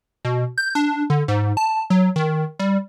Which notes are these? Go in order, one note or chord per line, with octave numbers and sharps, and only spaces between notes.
B2
G6
D4
D3
G#2
A5
F#3
D#3
G3